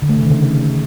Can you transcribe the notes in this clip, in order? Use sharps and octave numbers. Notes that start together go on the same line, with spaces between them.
D3
A3
C3
D#3
C#3